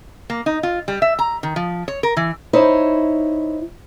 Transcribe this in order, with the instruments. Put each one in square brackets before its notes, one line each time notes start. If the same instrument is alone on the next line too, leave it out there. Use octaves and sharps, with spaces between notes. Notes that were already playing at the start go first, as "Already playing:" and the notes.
[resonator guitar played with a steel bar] A#3
D#4
F4
G3
E5
A#5
D#3
F3
C#5
A#4
E3
[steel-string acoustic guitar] D#4 E4 C5 C#5